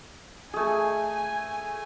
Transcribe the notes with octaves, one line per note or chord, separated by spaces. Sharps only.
A3 G#4 G#5